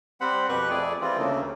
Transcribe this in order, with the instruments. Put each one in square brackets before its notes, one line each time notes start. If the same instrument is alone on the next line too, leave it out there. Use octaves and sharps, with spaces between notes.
[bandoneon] G3 C4 C5 F#5 B5
F2 B2 G4 B4 C#6 F#6
F2 A3 G#4 D5
E3 G3 C4 F4
D2 C#3 A3 A#3